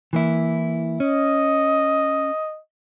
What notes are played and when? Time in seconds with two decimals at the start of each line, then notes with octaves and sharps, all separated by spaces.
0.13 E3 A#3 E4
1.00 C#4 D#5